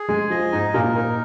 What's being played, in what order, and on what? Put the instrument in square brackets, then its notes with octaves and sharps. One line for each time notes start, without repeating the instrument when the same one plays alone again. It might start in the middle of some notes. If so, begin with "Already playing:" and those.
Already playing: [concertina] G#4
[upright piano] G#3 [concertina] G#5
[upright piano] F3 [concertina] D#5
[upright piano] G#2 [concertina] D#4
[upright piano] A#2 [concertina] A#4
[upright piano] A#3 [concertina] D#4